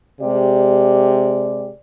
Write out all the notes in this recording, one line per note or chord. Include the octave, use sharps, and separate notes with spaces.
C3 G#3 G4 D5